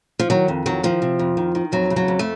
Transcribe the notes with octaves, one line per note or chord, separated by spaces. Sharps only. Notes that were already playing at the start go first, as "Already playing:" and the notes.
F3
D#3 F#3
F2
D#3 F#3
D#3 F3
C3
F2
D#3
D#3
F2 F#3
C#3
F#3
F2
A3